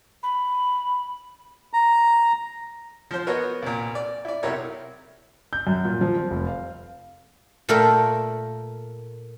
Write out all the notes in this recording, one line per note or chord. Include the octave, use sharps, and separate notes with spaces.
B5
A#5
F3 C5
B3 F#4 A#4 C#5 D#5
C2 A#2
D5
E4 D5
B1 C3 E4 A#4 C#5
G6
F#2
A#2
F3
C4
F1
F5
A#2 A3 A4 A#4 F5 G5